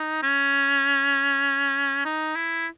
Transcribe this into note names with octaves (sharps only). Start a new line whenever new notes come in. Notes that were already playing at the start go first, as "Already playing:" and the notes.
Already playing: D#4
C#4
D#4
E4